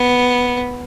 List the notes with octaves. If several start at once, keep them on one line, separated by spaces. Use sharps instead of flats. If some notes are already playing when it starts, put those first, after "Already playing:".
Already playing: B3